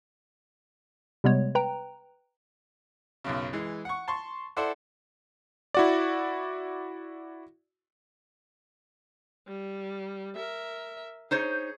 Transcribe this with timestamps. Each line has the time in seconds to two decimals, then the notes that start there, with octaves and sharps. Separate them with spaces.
1.24 C3 G3 G#3 B3 C#5
1.55 B4 G5 A#5
3.24 B1 F#2 C#3
3.53 E3 G#3
3.85 F#5 C#6
4.08 A5 C6 C#6
4.57 E4 A4 C5 D5 F#5
5.74 E4 F#4 D5
9.48 G3
10.35 A#4 E5
11.31 D#4 G#4 C5 C#5